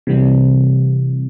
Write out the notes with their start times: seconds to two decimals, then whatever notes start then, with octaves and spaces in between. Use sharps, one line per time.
0.07 C3 E3 G3 C4